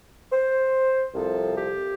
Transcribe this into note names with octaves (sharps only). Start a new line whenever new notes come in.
C5
C2 C3 F3 A4
G4